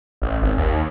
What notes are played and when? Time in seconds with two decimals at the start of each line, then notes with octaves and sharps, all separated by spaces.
0.22 A1
0.42 G#1
0.57 D#2